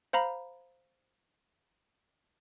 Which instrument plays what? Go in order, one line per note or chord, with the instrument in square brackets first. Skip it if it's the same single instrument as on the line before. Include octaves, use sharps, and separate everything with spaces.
[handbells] C5 F5 A#5 B5